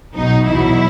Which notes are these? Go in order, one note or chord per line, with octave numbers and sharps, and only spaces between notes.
B1 B2 F#3 D#4
E2 B2 F#3 E4